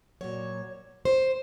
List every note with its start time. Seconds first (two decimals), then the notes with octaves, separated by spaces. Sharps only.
0.21 A#2 F#3 C#5
1.05 C5